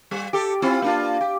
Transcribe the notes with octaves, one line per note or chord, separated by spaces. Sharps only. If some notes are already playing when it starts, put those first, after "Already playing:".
G3
G4 A4
C4 E4 F4
A#3 D4 F4
G4